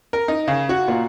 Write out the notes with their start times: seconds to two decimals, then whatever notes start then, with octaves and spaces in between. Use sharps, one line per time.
0.13 A#4
0.28 D#4
0.48 C#3
0.69 F#4
0.88 A#2